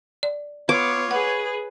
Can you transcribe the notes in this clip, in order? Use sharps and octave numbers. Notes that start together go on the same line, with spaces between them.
D5
B3 F4 B4 C#5 D6
G#4 B4 F#5